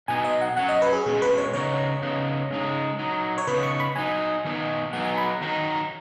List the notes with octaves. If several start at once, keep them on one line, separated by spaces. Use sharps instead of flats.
B2 B3 D#4 G#5
D#5
F#5
F#3 C#4 F#5
D#5
B4
G#4
B2 G#3 C#4 G#4
B4
C#5
C#3 B3 D#4 C#5
C#3 B3 D#4
C#3 G#3 D#4
F#3 D#4
C#5
C#3 B3 D#4 B4
C#6
B5
F#3 D#4 G#5
D#3 B3 D#4
F#3 B3 D#4 F#5
G#5
B5
D#3 F#3 D#4